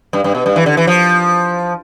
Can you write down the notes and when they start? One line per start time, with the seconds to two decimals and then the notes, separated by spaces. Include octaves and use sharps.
0.13 G2
0.24 G2
0.35 B2
0.46 G2
0.56 E3
0.66 D3
0.77 E3
0.87 F3